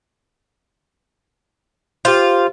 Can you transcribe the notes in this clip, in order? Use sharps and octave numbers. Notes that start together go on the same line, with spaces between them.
F4 G4 C5